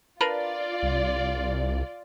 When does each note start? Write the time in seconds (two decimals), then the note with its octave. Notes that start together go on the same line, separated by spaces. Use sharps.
0.21 D4 F4 A#4 B4 D5
0.83 C2